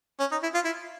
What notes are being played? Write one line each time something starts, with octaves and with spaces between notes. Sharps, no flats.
C#4
D#4
E4
F4
E4